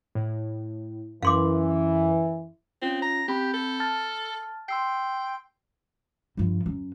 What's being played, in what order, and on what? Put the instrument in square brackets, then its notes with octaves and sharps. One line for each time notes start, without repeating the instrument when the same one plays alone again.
[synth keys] A2
[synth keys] F#2 [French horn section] E3 [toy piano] F5 C6 D6
[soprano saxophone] C4 [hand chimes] C#4 F4
[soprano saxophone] A#5
[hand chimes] C4 B5 G6 [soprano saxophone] G4
[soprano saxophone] A4
[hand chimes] A5 F6 A6
[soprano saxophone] G5 [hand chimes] C6 E6 C7
[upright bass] G2 F3
F#2